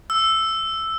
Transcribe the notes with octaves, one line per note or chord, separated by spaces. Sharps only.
E6